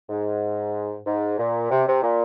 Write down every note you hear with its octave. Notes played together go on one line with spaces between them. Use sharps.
G#2
G#2
A#2
C3
C3
A#2